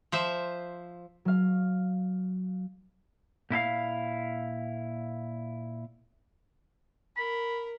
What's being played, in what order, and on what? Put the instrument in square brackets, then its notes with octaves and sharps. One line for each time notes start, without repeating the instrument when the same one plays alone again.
[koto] F3 C5 E5
[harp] F#3 F5
[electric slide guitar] A#2 E4 A4 F5
[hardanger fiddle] A#4 [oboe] B5